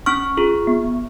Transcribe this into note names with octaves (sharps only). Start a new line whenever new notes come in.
C#4 C#6 F6
F4 G#4
B3